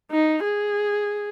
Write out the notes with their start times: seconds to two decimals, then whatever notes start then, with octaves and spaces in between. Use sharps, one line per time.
0.11 D#4
0.43 G#4